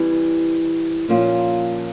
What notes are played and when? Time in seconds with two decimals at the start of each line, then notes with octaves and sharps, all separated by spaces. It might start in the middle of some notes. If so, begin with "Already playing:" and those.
Already playing: E3 G3 C4
1.08 A#2 F3 A#3 C#4 F4